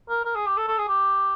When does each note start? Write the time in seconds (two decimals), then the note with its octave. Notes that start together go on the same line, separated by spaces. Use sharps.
0.09 A#4
0.25 A#4
0.35 G#4
0.47 G4
0.57 A4
0.68 A4
0.78 G#4
0.88 G4